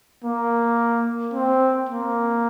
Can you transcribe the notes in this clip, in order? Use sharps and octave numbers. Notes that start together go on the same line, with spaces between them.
A#3
C4
A#3